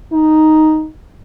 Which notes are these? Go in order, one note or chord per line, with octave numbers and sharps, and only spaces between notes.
D#4